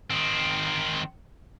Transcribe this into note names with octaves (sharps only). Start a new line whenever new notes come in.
D#3 C4